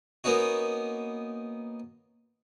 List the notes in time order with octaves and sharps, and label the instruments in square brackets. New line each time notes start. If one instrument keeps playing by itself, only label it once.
[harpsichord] A#3 B3 C#4 D#4 F#4